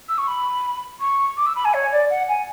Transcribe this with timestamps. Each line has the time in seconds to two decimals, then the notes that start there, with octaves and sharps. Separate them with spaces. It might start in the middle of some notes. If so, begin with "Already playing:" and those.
0.08 E6
0.17 C#6
0.27 B5
1.00 C#6
1.37 D6
1.46 E6
1.55 B5
1.64 G#5
1.73 C#5
1.92 D5
2.10 F#5
2.28 G#5